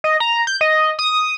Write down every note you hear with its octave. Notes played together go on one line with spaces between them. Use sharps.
D#5
A#5
G6
D#5
D#6